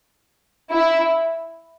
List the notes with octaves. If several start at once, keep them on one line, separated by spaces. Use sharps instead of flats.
E4